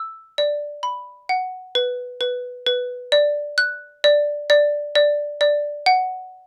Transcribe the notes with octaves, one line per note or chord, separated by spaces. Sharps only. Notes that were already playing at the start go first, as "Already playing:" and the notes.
Already playing: E6
D5
B5
F#5
B4
B4
B4
D5
F#6
D5
D5
D5
D5
F#5